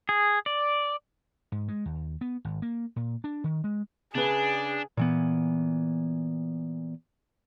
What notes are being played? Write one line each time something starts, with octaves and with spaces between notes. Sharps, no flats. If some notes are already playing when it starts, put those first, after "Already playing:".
G#4
D5
G#2
G#3
D#2
B3
G#1
A#3
A#2
D4
D#3
G#3
C#3 D4 G#4 B4
A#2 E3 B3